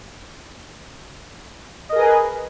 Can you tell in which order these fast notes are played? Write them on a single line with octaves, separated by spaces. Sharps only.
D#5 A#4 G#4 B4 G#5